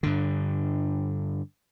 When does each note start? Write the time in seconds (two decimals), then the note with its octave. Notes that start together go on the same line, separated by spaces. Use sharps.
0.03 G2 D3